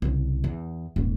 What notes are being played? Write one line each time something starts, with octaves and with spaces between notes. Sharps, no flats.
C2 C#3
E2
D#1 G#2